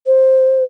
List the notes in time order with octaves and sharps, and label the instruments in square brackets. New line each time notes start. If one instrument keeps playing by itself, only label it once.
[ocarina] C5